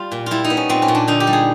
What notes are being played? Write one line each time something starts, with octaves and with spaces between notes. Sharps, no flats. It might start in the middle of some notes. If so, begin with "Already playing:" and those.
Already playing: G3 F4
A#2
G3 E4 F4
D#4
B3
C#4
A#2 C4
C#4
A#2
D4
D3 D#4
G4
G3
G#4